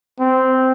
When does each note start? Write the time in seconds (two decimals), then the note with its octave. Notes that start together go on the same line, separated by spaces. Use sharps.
0.20 C4